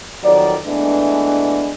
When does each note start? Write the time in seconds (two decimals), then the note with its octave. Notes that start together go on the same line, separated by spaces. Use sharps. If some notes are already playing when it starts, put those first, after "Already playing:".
0.23 F2 D#3 F#3 A#4 D5
0.66 E3 G#3 A3 B3 D4